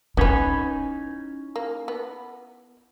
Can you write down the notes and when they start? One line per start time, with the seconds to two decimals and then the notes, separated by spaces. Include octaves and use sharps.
0.17 B3 C#4 D#4 E4 B4 G#5
1.56 A#3
1.88 B3